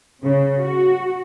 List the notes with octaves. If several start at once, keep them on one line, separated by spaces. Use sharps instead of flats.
C#3
F#4